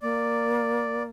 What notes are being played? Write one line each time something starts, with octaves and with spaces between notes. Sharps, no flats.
A#3 D5